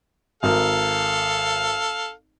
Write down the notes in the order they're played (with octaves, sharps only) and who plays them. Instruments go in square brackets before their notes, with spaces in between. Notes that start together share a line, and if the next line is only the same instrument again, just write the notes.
[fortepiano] G#1 A#4 [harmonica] A4 F5